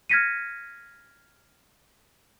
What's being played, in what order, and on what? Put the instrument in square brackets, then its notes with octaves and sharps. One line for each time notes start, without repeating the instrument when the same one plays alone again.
[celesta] F6 G#6 A#6 B6 C#7 D#7